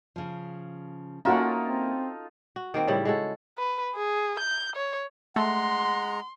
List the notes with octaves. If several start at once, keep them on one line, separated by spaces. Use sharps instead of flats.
C#3 F3
A#3 C#4 D#4 F4 F#4 A4 E5 F#5
C4
F#4
D#3 A#3 C4
A2 C#3 G3 E4
G#3 F#4 A4
B4
G#4
G6
C#5
G#3 A3 F#5 A#5 C6